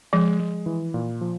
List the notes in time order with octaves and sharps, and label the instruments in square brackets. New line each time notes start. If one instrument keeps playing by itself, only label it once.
[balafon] F3 [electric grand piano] G#3
[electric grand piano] G#3
E3
A#2
F3